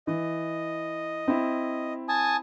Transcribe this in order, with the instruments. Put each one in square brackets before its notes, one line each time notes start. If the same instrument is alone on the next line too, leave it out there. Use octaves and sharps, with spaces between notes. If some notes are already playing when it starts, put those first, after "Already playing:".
[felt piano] E3 [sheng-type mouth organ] D#5
[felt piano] C4 E4
[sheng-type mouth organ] G#5 A5 D#6